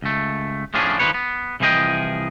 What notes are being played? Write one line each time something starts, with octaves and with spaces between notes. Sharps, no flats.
C#2 A3
A2 F3 C#4 D4 G#4
D#3 F3 A3 C4 B4 C#5
B3
C2 E3 F3 G#4 D#5 G5